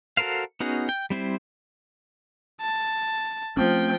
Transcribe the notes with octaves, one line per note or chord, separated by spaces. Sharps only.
F#4 A4 A#4 C5 F5
B3 C#4 D#4 F#4 G#4
G5
G3 C4 E4 C5
A5
F3 A3 C4 C#4 G5